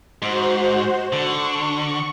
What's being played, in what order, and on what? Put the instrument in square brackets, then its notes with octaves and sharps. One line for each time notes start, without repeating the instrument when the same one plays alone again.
[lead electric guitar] G#2 [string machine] F#4 C5
[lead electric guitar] D3 [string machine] C#6